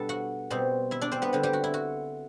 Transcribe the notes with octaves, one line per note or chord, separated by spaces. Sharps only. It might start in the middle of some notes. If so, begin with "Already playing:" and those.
Already playing: B2 G3 B3 D4 A4 B4 A5
F#4 F#5
B2 G3 C4
E4 E5
D4 D5
C4 C5
B3 B4
D3 G3 C4
G3 G4
F#4
E4
F#4